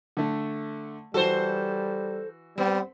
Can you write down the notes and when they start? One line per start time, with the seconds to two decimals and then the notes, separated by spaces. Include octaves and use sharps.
0.17 D3 A3
1.14 E3 G3 F#4 A4 C5
2.58 G3 B3 C4